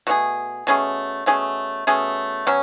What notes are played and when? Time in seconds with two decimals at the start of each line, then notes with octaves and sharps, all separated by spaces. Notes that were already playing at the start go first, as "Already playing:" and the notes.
0.07 B2 A3 C#4 G#4
0.67 B2 A3 C#4 G#4
1.26 B2 A3 C#4 G#4
1.87 B2 A3 C#4 G#4
2.47 B2 F#3 C#4